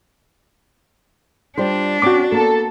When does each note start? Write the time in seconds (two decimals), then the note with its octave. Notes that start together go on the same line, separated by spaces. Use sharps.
1.58 G3 D4 F4 C5
2.02 C4 C#4 F#4 D6
2.32 A#3 B3 A4